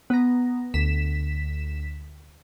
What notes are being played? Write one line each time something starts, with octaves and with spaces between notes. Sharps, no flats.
B3 A#5
D2 B6 E7